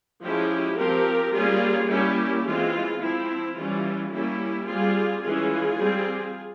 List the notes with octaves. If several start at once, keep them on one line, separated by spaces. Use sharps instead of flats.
F3 G#3 C#4 E4 G4
F3 C4 G4 A#4
G3 A#3 C#4 F4 G#4
G3 A#3 C#4 E4 G4
E3 G#3 C4 F4
F3 C4 E4
E3 G3 C#4 F4
G3 A#3 C#4 E4 G4
G3 C4 F4 G#4
E3 G#3 C#4 F4 G#4
G3 C4